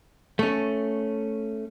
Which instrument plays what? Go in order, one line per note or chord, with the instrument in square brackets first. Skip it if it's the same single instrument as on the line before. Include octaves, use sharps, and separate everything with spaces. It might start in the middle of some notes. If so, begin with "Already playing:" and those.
[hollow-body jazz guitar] A3 C#4